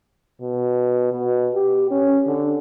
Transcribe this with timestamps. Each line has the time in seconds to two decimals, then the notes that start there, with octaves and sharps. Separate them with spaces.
0.41 B2
1.12 B2
1.55 G4
1.91 C#4
2.26 D3